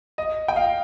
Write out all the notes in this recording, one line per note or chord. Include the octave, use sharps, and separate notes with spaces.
D#5
G5
F5